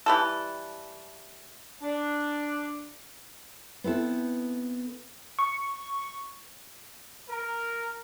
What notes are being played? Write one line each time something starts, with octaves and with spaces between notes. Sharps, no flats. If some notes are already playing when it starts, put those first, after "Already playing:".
E3 G3 A4
D4
B3 C4 E4 A4
C#6
A#4